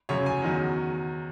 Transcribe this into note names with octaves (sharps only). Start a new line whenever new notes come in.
F#2 C#3 F#3 C#5
G#5
E2 D#3 F#3